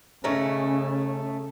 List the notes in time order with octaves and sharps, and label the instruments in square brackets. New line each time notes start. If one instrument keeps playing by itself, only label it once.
[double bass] C#3 [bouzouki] A3 C#4 D#4